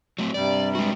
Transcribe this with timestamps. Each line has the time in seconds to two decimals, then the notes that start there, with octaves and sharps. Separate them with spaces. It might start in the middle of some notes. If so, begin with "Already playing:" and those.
0.19 F#3 A3 C4
0.34 G2 C3 G3 D5
0.75 G#3 F#4